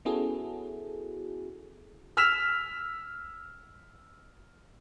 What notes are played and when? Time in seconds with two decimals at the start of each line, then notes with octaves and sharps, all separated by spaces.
0.05 B3 C#4 E4 F#4 G#4 A4
2.17 E6 F6 B6 E7 F7